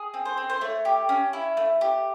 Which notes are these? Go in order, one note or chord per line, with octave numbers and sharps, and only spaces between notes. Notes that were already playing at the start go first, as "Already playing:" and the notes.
Already playing: G#4
C4
C5
C4
C5
A3 C#5
G4
C#4
E4
A3
G4